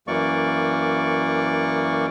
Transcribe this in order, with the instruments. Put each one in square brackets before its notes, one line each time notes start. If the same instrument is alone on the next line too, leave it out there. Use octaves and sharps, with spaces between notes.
[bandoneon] F#2 E3 A#3 D5 C#6